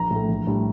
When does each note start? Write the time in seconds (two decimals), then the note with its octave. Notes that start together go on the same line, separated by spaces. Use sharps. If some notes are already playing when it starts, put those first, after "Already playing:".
Already playing: A#1 A#5
0.11 A2 A3
0.29 A#1
0.47 A2 G3 D4